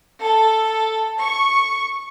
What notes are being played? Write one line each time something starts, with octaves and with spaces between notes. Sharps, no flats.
A4
C#6